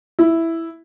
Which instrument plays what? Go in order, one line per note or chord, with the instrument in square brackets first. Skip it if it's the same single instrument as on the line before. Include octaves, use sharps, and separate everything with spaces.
[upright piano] E4